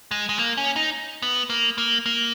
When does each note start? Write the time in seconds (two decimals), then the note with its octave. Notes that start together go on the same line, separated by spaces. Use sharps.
0.11 G#3
0.29 G#3
0.39 A#3
0.57 C#4
0.76 D#4
1.22 B3
1.50 A#3
1.78 A#3
2.06 A#3